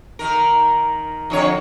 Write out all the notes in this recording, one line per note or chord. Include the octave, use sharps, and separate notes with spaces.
D#3 A#4
F2 D3 C#5